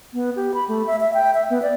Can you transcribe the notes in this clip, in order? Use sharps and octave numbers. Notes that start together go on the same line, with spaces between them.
B3
G4
B5
A3
E5
E5
G5
E5
B3
D5